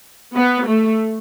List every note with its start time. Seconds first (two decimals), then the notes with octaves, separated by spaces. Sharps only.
0.35 B3
0.67 A3